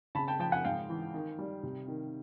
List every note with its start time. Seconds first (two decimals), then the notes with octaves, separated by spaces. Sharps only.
0.15 C#3 A5 B5
0.28 G5 A5
0.39 F3 G5 A5
0.52 F#5 G#5
0.65 G#2 F5 G5
0.89 E3
1.14 D#3
1.39 G3
1.63 C3
1.88 D#3